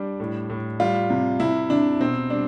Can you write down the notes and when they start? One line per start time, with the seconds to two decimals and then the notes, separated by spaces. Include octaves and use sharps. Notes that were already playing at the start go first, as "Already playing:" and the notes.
Already playing: G3 D4
0.20 A2
0.50 A2
0.80 G3 F4
1.10 C3
1.40 C3 E4
1.70 C3 D4
2.00 B2 C4
2.30 G3 D4